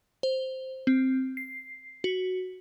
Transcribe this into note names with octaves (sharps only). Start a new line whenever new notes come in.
C5
C4
C7
F#4